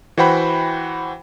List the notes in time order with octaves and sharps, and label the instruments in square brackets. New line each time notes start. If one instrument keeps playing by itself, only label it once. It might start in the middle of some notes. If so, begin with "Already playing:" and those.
[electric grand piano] E3 F#4 C5 F#5 G5 B5